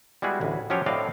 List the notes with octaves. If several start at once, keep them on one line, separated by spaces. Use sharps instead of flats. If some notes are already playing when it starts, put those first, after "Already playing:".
G3 G#3 B3 E4 F#4 G#4
A1 D2
F3 F#3 C#4 F4 G4 C#5
A2 C4 D4 D5 D#5 F5